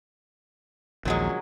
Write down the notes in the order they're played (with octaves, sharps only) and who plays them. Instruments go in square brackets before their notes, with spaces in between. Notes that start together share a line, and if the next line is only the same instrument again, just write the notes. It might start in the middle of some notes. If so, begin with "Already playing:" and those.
[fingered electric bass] A#1 D#2 [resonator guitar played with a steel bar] A#2 F#3 G#3